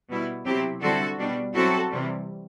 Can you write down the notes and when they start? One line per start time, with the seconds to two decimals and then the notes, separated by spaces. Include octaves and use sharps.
0.09 B2 G3 B3 E4
0.45 C3 F#3 C4 E4 G4
0.81 D3 G3 C4 E4 F#4 A4
1.18 B2 G3 D4
1.54 F#3 C4 E4 F#4 A4
1.90 C3 E3 G3